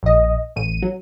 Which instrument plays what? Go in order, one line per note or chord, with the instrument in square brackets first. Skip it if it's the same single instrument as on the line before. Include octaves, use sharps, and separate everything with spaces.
[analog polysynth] A#1 D#5
A1 D#7
F#3